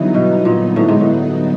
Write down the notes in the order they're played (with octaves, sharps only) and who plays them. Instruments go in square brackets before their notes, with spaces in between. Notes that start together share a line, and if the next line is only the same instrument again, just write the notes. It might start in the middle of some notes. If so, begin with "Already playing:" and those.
Already playing: [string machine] G2 D3 F#3 B3 D#4 [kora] E3
[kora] B2
A#2
A2
G#2
A2